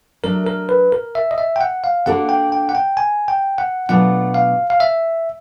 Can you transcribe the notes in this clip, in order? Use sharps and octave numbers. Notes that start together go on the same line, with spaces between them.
F#3 A3 D4 A#4
A#4
B4
A#4
E5
D#5
E5
G5
F#5
F5
A#3 D4 F#4 A4 C5 F#5
G5
G5
F#5
G5
G#5
G5
F#5
B2 F#3 A3 D4 F4 F#5
F5
F5
E5